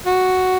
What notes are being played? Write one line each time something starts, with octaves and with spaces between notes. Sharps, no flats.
F#4